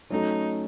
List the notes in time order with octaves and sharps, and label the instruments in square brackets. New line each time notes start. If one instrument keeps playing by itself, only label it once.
[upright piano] F#3 A3 C#4 [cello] D#4